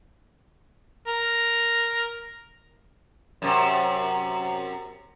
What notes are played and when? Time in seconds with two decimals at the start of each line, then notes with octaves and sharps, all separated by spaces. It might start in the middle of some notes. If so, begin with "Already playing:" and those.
1.08 A#4
3.42 F#2 C3